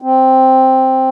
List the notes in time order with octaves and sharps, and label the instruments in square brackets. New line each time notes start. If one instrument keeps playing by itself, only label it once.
[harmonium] C4